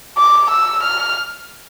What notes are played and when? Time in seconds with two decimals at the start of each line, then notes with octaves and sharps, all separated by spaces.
0.18 D6
0.51 E6
0.84 F6